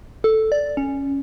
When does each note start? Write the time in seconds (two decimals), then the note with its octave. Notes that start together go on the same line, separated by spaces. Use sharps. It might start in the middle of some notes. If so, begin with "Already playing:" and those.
0.24 A4
0.52 D5
0.77 C#4